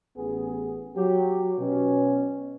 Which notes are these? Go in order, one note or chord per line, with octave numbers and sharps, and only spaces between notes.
A1 B3 G#4
F#3 G4
B2 C#4